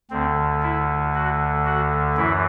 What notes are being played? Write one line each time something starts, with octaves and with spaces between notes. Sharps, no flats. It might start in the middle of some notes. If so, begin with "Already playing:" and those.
D2 D3 C4
E4
F#4
F#4
F#2 E3 E4